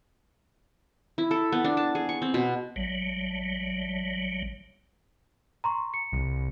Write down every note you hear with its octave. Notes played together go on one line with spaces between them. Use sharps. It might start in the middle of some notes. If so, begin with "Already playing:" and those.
E4
A4
B3
D4
A5
G#4
C#6
C4
B2
A1 F#3 G3
A#5 C6 C#6
C#7
C2